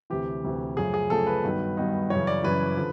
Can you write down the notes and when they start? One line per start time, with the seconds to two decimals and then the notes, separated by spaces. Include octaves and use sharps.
0.10 D2 C3 E3 G4
0.44 D2 C3 E3
0.77 F#2 C#3 F3 A3 G#4
0.94 G#4
1.10 F#2 C#3 F3 A3 A4
1.27 B4
1.43 G2 D#3 F#3 B3 D#4
1.77 G2 D#3 F#3 B3 D#4
2.10 F#2 C#3 E3 C#5
2.27 D5
2.44 F#2 C#3 E3 B4
2.77 D3 F3